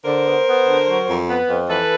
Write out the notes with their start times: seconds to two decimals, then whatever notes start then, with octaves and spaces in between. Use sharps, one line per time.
0.05 D3 A#4 C5
0.26 B3
0.47 B3
0.67 D3
0.88 F#3
1.08 F2
1.29 B3
1.49 F2
1.70 E3 A4 B4